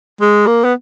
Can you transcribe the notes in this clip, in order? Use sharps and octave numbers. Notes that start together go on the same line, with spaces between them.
G#3
A#3
B3